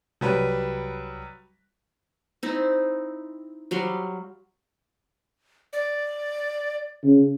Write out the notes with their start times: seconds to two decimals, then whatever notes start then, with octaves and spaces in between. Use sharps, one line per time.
0.21 C2 F#3 G3 B4
2.43 C4 D#4 E4
3.71 F#3 G3 F5 C6
5.73 D5
7.04 C#3